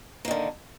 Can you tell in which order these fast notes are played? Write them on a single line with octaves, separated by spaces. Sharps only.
A#3 D#3 D3